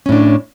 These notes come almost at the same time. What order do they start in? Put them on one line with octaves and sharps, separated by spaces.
C#4 A2 D4